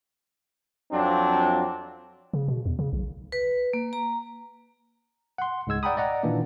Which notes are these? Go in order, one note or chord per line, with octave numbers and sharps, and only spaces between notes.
F2 F3 F#3 C4 D4
C#3
B2
E2
C#3
B1
B4
A#3
A#5
F#5 C6
C#2 G#2 G#3 E6 G#6
D5 F#5 G5 A#5 B5 D#6
D5 D#5 F#5 A#5
A#2 D#3 E3 A#3 D4